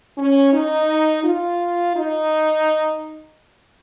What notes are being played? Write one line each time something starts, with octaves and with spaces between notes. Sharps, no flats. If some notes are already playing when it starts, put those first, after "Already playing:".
C#4
D#4
F4
D#4